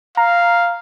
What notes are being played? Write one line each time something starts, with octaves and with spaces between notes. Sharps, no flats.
F5 A#5